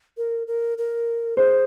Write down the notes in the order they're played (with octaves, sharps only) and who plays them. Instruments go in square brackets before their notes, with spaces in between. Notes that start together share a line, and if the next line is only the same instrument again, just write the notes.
[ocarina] A#4
A#4
A#4
[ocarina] G#4 [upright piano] C5